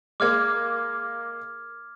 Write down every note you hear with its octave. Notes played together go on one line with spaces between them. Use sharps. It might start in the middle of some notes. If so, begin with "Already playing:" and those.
G#3 A#3 D6 F6 G#6